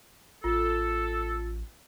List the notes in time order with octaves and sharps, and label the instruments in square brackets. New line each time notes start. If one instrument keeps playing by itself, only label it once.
[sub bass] A1 [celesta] F4 [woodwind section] A4